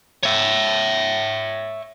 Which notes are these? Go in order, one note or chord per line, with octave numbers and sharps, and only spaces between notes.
C#5 E5